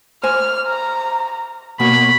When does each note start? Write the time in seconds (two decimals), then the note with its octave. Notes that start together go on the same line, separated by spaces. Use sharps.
0.24 C5 G#5 F6
0.68 A#5
1.80 B2 A#3 C#5 B5